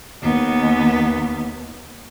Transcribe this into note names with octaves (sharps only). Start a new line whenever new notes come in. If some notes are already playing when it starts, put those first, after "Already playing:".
D#2 B3